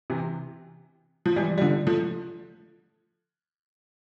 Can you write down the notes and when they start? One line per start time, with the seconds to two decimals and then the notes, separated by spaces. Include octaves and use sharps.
0.10 C3 E3
1.26 F3
1.36 E3 G3
1.58 G3
1.62 D3 F3
1.87 F3 A3